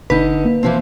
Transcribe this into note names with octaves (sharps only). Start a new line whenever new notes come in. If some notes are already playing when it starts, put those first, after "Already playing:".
G1 D3 D#4 B4
A#3
E3 F3 C4